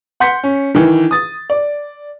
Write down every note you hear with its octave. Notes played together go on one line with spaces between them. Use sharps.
F#5 C6 G6 B6 C#7
C#4
D#3 E3
D#6 A6
D5